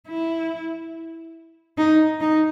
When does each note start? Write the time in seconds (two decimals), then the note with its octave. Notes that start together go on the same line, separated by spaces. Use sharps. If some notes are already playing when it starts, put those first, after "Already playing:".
0.08 E4
1.78 D#4
2.21 D#4